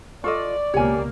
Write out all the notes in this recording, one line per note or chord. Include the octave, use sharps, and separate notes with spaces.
F4 A4 D5 D#5 C#6
C#2 B2 A#3 G4 C#5 G#5